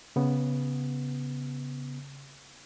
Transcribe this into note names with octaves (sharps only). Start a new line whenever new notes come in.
C#3 B3